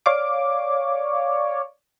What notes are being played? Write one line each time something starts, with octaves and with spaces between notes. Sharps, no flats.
C#5 D5 F5 D6